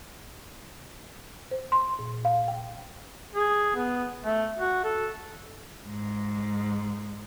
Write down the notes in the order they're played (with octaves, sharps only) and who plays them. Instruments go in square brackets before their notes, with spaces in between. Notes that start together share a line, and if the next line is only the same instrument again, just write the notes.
[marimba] C5
C6
A#2
F5
G5
[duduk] G#4
B3
A3
F#4
A4
[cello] G#2